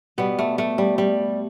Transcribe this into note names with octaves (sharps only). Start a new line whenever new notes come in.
B2 G3 B3
A3
A3
G3
G3